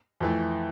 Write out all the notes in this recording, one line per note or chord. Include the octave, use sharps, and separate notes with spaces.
F2 E3 A3